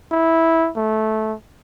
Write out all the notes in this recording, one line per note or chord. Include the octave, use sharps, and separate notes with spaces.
E4
A3